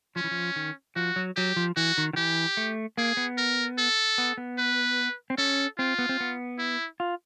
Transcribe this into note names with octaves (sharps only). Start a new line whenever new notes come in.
F3 C#4
E3
F3
D#3
F3 F#4
F#3
F#3 G4
F3
E3 F#4
D#3
D#3
E3 G4
A3
A#3 G#4
B3
A#4
A4
B3
B3
B4
C4
C#4 A4
C4 F4
B3
C4
B3
E4
F4